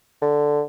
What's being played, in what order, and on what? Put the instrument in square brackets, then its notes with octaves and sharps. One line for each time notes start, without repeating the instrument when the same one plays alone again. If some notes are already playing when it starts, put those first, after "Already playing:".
[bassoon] D3